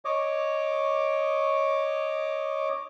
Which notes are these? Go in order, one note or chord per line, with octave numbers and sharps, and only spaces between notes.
C#5 D#5 D6